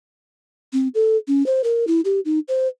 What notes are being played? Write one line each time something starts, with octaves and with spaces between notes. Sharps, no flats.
C4
A4
C#4
C5
A#4
E4
G4
D#4
C5